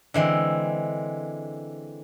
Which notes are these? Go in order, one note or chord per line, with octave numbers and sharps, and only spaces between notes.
D3 E3 G#3 C4